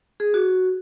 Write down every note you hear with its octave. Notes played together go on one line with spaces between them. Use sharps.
G#4
F#4